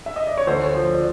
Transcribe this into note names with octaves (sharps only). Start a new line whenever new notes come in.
E5
D#5
D5
C#5
D2 C5
C#5
F3 C5
D5